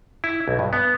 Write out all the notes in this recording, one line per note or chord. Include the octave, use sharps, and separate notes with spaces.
E4
B1
G2
B3